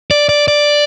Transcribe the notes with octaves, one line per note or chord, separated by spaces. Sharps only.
D5
D5
D5